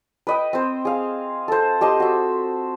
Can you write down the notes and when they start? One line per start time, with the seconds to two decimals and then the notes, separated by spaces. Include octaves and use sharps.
0.27 B4 D#5 G5
0.53 C4 C5
0.85 G#4 F5
1.48 A4 C5
1.81 G4 C5 D#5 A5
2.00 F#4 E5